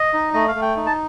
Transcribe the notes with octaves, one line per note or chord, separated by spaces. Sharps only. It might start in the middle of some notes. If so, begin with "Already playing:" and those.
Already playing: D#5
D#4
A3 D#5
F5
A3
G5
D#4
A5